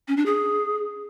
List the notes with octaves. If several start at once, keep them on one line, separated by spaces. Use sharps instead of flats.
C#4
D4
G#4